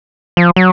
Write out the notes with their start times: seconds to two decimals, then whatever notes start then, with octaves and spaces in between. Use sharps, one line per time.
0.37 F3
0.56 F#3